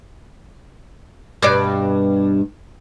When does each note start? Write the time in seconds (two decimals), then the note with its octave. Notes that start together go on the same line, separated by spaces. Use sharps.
1.42 G2 B2 D5